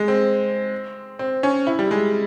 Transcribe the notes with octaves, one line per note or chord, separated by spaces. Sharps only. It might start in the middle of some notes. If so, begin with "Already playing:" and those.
Already playing: G#3
C4
C4
C#4
E4
G3
G#3